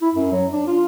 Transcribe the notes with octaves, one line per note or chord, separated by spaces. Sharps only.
E4
F#2
F#3
D4
F4